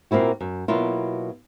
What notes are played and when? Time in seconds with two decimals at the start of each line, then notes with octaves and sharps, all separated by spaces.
0.11 A#2 A#3 C4 E4 F#4
0.41 F#2
0.68 B2 F#3 A#3 E4 F4